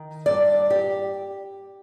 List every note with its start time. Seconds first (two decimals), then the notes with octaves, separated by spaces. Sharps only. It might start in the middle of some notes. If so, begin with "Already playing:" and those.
Already playing: D#3
0.26 G2 D5
0.70 G4